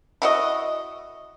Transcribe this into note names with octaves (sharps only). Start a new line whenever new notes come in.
E4 F#4 D#5